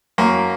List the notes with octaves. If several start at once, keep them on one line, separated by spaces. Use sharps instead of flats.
F#2 A#3